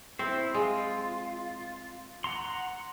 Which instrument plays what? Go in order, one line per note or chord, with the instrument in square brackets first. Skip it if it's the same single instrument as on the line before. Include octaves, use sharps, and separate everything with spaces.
[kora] C4 [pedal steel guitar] E4 C5
[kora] G#3 [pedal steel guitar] F4
[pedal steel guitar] F#5 A#5 C6